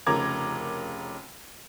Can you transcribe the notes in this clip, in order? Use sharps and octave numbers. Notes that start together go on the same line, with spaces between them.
F1 C#3 A#4 A#5 D6 G#6